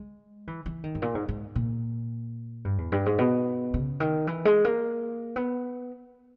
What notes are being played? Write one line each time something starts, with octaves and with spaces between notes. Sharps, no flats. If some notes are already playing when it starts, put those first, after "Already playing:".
Already playing: G#3
E3
E3
D#3
G#2
A#2
G#2
G#2
A#2
G2
E2
G2
G#2
B2
C#3
D#3
E3
G#3
A#3
B3